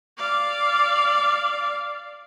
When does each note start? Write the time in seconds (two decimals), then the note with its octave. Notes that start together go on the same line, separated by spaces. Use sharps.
0.18 D5 F5